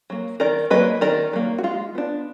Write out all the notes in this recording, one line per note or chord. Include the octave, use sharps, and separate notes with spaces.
F#3 A#3
D#3 A#4 D5
F#3 A#3 B4 D#5
D#3 A#4 D5
F#3 A#3
F#4
G#3 F4
B3 D4